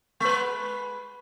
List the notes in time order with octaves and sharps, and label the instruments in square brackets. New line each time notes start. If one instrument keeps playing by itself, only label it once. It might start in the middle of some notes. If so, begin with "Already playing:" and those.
[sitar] G#3 B4